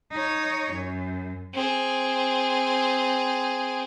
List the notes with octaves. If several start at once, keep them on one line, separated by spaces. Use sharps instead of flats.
D#4 C#5
F#2
C4 G#4